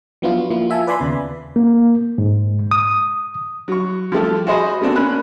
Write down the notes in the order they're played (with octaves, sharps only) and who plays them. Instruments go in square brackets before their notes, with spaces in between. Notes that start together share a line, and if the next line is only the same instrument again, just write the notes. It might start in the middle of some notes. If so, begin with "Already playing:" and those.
[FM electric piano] F3 F#3 B3 D4 E4 F4
F#4
F3 A#3 E4 F4
F4 E5 G#5 A5
B4 D5 G#5 B5 C6
D#2 C#3 B3
[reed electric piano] A#3
G#2
D#6
[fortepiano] F#3 C#6
F3 G3 A3 G4
F#4 G#4 C5 D#5 B5
A3 B3 C4 D4 F#4
A#3 C#4 B5 F#6